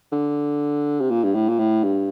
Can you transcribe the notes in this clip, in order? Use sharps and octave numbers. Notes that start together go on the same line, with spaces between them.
D3
C3
A#2
G2
A2
A#2
A2
G2